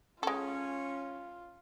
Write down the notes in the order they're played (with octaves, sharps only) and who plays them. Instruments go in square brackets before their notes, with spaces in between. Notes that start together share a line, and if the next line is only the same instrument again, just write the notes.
[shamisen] G#3 A4 [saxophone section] C#4 [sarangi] F4